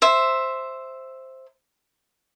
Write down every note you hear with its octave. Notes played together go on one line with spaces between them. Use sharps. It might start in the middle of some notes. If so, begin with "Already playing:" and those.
C5 E5